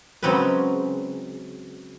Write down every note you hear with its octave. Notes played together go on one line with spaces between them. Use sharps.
C#3 F#3 G#3 C4 A#4 B4